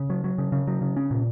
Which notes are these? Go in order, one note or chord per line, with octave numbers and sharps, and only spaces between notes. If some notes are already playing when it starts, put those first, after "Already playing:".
Already playing: C#3
F#3
F#3
C#3
C#3
F#3
C#3
C#4
A#2